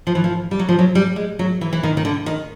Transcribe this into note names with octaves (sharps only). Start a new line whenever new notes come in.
F3
E3
F3
G3
F#3
F3
F#3
G3
G#3
F#3
E3
E3
D#3
D#3
D3
D#3